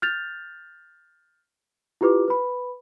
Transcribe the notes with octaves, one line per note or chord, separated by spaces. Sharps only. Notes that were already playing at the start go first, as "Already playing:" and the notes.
F6 G6 A6 F7
E4 F4 G4 B4 D6
B4 B5